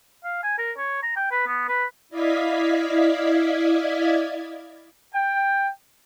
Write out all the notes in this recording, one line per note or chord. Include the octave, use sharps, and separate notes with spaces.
F5
G#5
A#4
C#5
A#5
G5
B4
B3
B4
E4 D5 D#5 F5 G#6 B6
G5